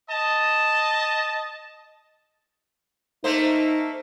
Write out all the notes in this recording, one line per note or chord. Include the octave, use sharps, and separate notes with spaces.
D#5 A5
A3 A#3 D#4 C5